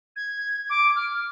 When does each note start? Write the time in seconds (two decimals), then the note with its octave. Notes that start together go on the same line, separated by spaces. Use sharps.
0.16 G#6
0.70 D6
0.96 F6